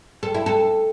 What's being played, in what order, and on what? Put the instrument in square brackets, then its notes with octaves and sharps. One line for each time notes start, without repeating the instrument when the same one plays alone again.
[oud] A4
E4
A4